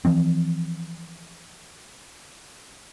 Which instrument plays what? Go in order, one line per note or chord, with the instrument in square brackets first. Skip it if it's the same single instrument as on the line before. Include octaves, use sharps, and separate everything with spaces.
[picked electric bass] E3 F3 C4